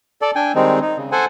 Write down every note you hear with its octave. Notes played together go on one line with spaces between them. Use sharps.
A4 D5
D4 G5 G#5
D#3 G3 G#3 C4 D#4
D#4
C#3
A4 C5 F#5 G#5